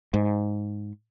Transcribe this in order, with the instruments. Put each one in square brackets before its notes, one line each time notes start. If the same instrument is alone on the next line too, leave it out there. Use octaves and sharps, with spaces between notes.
[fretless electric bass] G#2